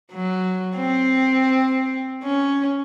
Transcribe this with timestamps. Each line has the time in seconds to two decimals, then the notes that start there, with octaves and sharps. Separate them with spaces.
0.13 F#3
0.77 C4
2.23 C#4